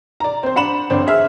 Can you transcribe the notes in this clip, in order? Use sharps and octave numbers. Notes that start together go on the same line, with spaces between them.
D5 A#5
C4 C5
D4 F#5 B5 E7 F#7
G1 C4 D4
G#4 E5 F6